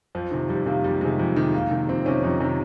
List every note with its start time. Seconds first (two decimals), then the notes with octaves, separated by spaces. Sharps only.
0.15 F2 F3
0.31 C3 D#3
0.49 F2 G3
0.66 C3 D#3 A#3
0.84 F2 G3
1.01 C3 D#3 G#3
1.19 F2
1.36 C3 D#3
1.54 F2 A#3
1.71 C3 D#3
1.88 F2 C4
2.05 C3 D#3 C#4
2.23 F2 D#4
2.40 C3 D#3